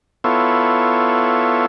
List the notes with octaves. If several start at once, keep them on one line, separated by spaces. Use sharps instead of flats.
B3 E4 F4 A4 C#5